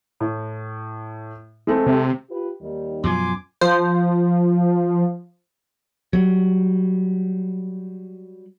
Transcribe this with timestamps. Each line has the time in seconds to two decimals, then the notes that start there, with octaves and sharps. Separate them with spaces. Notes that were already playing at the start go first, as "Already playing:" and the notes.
0.20 A2
1.67 G#3 A3 C4
1.86 C3
2.30 F4 G4 B4
2.61 D#2 D#3 G3
3.04 F#2 B2 F3 G#5 C6 D6
3.61 F3 C5
6.13 F#3 G3